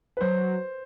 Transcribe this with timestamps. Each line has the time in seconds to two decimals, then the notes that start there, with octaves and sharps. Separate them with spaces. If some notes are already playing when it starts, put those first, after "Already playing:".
0.17 B4
0.21 F#3 C5